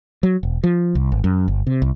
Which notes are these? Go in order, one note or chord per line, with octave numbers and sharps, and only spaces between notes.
F#3
E1
F3
C2
G#1
F#2
G1
C3
C2